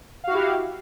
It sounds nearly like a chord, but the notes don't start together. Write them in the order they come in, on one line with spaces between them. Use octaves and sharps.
F5 F#4 E4 G4